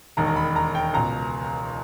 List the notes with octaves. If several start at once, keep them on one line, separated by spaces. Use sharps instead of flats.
E1 D#2 D#3 A#5
A#5
B5
A#5
G5
C#2 B2 A#5